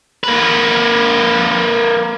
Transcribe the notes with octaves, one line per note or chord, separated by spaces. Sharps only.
A#3 B4